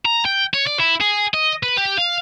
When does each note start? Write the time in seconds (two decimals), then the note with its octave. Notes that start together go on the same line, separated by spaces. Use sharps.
0.06 A#5
0.25 G5
0.54 C#5
0.67 D5
0.80 E4
1.01 G#4
1.34 D#5
1.63 B4
1.77 G4
1.98 F5